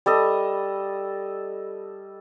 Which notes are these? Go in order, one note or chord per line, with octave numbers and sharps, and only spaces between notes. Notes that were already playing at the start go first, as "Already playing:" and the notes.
G3 A4 D#5